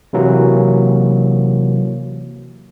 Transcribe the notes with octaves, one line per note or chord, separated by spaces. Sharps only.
C3 E3 F#3 A#3